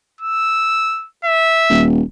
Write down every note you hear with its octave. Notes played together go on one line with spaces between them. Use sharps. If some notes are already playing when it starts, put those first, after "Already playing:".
E6
E5
D#1